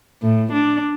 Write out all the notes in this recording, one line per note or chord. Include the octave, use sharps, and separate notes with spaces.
A2
D4